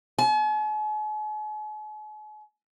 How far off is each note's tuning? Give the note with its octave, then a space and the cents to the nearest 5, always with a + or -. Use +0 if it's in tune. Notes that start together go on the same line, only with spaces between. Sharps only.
G#5 +45